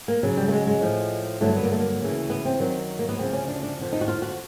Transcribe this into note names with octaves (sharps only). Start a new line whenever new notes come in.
A#3
F#2 C#3 F#3
G3
A3
G#3
G#3
A2 F3
G2 D3 F#3 A3
B3
A#3
A3
A#3
D2 C#3 E3
B3
C4
F#2 D#3 F#3
A#3
B3
D2 C#3 F3 C4
C#4
D4
D4
F2 D3 F3
D#4
F#4
F4
F#4